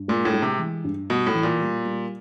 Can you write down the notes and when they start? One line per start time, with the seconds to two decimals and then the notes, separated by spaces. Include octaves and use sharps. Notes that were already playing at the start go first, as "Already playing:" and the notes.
Already playing: G2
0.08 A#2 G#3
0.25 A2
0.34 G#3
0.42 C3
0.59 E3
0.84 G2
1.10 B2 G3
1.26 A2
1.35 E3
1.43 A#2
1.60 G3
1.85 G3